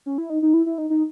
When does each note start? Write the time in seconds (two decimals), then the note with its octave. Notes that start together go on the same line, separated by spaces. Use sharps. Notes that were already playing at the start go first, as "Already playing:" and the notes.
0.06 C#4
0.18 E4
0.30 D#4
0.42 D#4
0.54 E4
0.66 E4
0.78 D#4
0.90 D#4